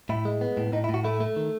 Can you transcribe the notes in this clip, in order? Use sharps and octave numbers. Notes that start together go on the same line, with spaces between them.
A2 E4
G#3
B3
A2
A2 D#4
E4
A2 F#4
A3 E4
A3
D#3